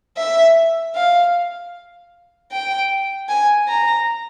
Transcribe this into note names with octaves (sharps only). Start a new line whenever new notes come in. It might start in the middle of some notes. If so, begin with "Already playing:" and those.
E5
F5
G5
G#5
A#5